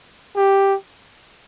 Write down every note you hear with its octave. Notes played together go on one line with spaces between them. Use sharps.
G4